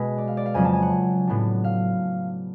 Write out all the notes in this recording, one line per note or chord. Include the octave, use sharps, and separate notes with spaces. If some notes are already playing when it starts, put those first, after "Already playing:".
Already playing: B2 G#3 B4
D5
F5
D5
F5
F2 C#3 F#3 C#4 G#5
A5
G#5
F#5
A2 F#3 B3 D4
F5